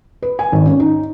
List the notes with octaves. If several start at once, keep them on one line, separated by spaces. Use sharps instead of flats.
B4
G#5
G#1
C#4
D#4